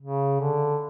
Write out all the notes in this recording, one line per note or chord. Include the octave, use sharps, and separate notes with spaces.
C#3
D3